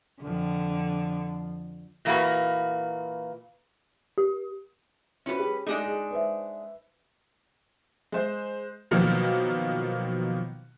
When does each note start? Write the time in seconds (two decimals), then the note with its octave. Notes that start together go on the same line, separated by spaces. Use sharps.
0.22 F2 D3 F3
2.05 A#2 E3 A#3 D4 F#4 B4
4.18 G4
5.26 C#4 E4 F#4 B4 C5
5.39 G4 G#4
5.66 G#3 A3 D4 D#4 G4
5.86 G#4
6.11 B4 C5 E5
8.12 G#3 C5
8.91 B2 D#3 F3 F#3 A#3